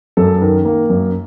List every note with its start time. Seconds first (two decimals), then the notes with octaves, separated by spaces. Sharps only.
0.17 F#2 A4
0.42 D#3 A#4
0.65 A#3
0.90 F#2